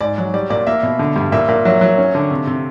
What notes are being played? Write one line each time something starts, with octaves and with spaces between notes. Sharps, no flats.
G#2 D5
F#3
G3 D5
A#2 D5
A#3 E5
B2
D3
G2
A#2 E5
A#2 F5
F#3 E5
F#3
C#4
D3
C3
C3